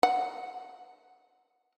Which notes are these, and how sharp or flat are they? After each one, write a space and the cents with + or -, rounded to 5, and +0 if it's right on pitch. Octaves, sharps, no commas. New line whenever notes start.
F#5 -5